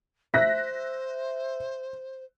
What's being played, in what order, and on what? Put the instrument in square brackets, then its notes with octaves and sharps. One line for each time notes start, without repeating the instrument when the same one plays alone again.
[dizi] C5 [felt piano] E5 [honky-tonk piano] F#6 A#6 B6